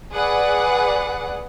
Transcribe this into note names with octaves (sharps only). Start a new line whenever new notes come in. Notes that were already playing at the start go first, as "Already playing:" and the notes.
G#4 B4 D5 F#5